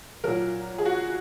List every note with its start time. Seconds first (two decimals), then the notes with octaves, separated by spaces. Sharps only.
0.24 A#2 F#3 A#4
0.78 G#4
0.85 F#4